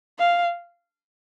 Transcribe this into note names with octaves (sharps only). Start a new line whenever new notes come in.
F5